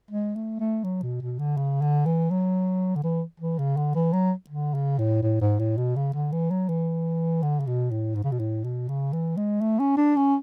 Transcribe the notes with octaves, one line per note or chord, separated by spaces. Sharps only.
G#3
A3
A3
F#3
B2
B2
D3
C#3
D3
E3
F#3
D3
E3
E3
C#3
D3
E3
F#3
D3
C#3
A2
A2
G#2
A2
B2
C#3
D3
E3
F#3
E3
D3
C#3
B2
A2
G#2
C#3
B2
A2
B2
C#3
E3
G#3
A3
C#4
D4
C#4